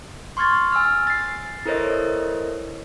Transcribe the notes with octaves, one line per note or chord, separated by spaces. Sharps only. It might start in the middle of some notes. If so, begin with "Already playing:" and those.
C6 C#6 F6 G#6 A6
G#5 E6 F6
A6 C7
E4 A4 A#4 C5 C#5 D#5